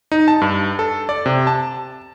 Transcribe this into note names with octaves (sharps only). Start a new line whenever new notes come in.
D#4
A5
G2
A4
D5
C3
A5